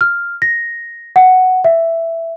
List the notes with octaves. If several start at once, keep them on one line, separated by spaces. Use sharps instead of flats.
F6
A#6
F#5
E5